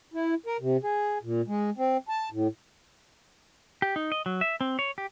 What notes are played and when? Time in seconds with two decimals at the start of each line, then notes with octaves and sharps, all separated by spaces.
0.14 E4
0.46 A#4
0.60 C3
0.82 G#4
1.23 A#2
1.47 G#3
1.77 C4
2.09 A5
2.31 A2
3.82 G4
3.96 D#4
4.12 D#5
4.26 F#3
4.41 E5
4.61 C4
4.79 C#5
4.98 G4